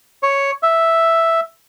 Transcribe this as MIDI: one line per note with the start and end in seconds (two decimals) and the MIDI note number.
0.23 0.51 73
0.63 1.40 76